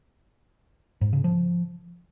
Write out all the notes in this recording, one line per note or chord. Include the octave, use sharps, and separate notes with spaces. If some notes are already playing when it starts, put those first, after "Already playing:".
G#2
C#3
F3